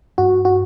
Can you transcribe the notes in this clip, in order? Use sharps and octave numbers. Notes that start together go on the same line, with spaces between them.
G2 F#4
F#4